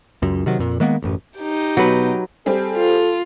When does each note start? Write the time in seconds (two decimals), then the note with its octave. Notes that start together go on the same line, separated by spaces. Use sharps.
0.22 C#2 F#2
0.46 C3 D#3 F#3
0.59 F2 A#2
0.80 D#3 G#3 A#3 B3
1.02 A1 F#2
1.38 D#4 G4
1.77 B2 F#3 B4
2.46 G3 C4 G#4 A4
2.76 F4